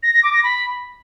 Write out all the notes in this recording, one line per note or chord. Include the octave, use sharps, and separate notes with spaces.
A#6
A#6
D6
A#6
B5